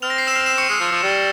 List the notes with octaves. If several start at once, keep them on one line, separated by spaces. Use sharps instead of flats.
C4 F6 F7
A#6
C7
E6 E7
F6 F7
E6 E7
C#6 C#7
G#3 C7
F3
F3
G3